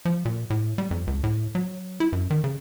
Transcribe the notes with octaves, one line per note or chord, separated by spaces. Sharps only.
F3
A#2
A2
G3
F2
C#2
A2
F#3
E4
F#2
D#3
C#3